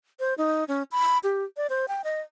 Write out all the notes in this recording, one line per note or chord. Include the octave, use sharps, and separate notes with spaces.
C5
D#4
C#4
B5
G4
D5
C5
G5
D#5